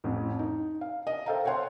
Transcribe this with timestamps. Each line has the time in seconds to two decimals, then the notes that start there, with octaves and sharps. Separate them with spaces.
0.04 A1 F2
0.39 D#4
0.81 F5
1.07 D#5
1.26 A4 C5 E5 F5 G5 A#5
1.45 C5 C#5 F5 F#5 C6